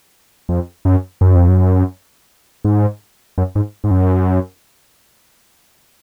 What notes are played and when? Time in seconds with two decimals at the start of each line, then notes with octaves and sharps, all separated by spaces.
0.49 F2
0.85 F#2
1.21 F#2
1.35 F2
1.49 F#2
2.65 G#2
3.38 F#2
3.55 G#2
3.84 G#2
3.91 F#2